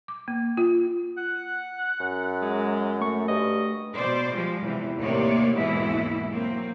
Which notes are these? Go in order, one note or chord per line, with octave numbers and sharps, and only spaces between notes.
D6
A#3
F4
F#5
F#2
G#3
A3 C#6
G2 D#5
B2 C5 D5
F3 G3 G#3
E2 C3 E3
D#2 A2 C3 A#3 C#5 D5
D#2 G#2 B2 E3 G#3 E4
F#3 A#3 C4